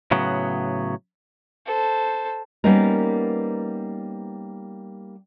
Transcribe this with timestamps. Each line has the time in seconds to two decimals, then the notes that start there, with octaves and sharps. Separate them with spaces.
0.11 A2 C#3 F#3 B3
1.66 A4 C5
2.64 G3 A#3 B3 C#4 D#4 A#4